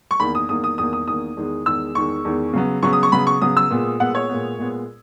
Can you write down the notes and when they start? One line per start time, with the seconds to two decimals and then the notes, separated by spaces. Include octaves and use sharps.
0.11 C#6
0.19 E2 D#3 A#3 B5
0.35 D#6
0.49 E2 D#3 A#3 D#6
0.64 D#6
0.78 E2 D#3 A#3 D#6
0.93 D#6
1.07 E2 D#3 A#3 D#6
1.37 E2 D#3 G#3
1.66 E2 D#3 G#3 E6
1.95 E2 D#3 G#3 C#6
2.25 E2 D#3 G#3
2.53 C#3 F#3 B3
2.83 C#3 F#3 B3 C#6
2.93 D#6
3.03 C#6
3.12 C#3 F#3 B3 B5
3.27 C#6
3.42 C#3 F#3 B3 D#6
3.57 E6
3.70 A#2 G#3 B3
4.00 A#2 G#3 B3 F#5
4.15 C#5
4.29 A#2 G#3 B3
4.58 A#2 G#3 B3